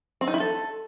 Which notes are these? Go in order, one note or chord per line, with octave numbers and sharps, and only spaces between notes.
C4
D#4
E4
A4